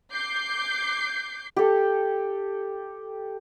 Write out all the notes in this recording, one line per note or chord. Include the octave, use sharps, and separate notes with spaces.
D6 G6 C7
G4 A4